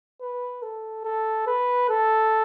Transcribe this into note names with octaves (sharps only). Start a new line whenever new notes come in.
B4
A4
A4
B4
A4